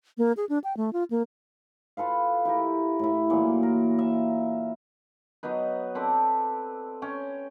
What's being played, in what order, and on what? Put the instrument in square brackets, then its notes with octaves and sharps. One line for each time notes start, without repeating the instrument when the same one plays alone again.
[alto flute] A#3
G#4
D4
G5
A3
F4
A#3
[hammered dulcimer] F4 A4 B4 F5
E4 G4 A#4
A2 E4
A#2 E3 F#3 A#3
A#4
E5
F#3 B3 D#4 B4
C4 A4 B4 D5
C#4 G5 G#5